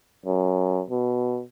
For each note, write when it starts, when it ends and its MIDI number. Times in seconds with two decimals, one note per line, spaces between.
0.26 0.81 42
0.90 1.42 47